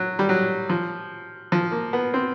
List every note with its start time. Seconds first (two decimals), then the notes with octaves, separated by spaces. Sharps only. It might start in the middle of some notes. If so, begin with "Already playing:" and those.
Already playing: F#3
0.19 G3
0.29 F#3
0.69 F3
1.52 F3
1.72 A#3
1.93 B3
2.14 C4